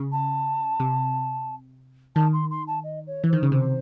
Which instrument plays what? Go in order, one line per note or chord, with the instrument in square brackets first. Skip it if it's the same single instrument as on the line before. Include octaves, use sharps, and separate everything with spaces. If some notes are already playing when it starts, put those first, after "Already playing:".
Already playing: [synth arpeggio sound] C#3
[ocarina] A5
[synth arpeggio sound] C3
[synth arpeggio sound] D#3 [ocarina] A5
[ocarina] C6
C6
A5
D#5
C#5
[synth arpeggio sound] E3
[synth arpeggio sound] D#3 [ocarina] C5
[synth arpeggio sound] C#3
[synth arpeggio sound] C3 [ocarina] C5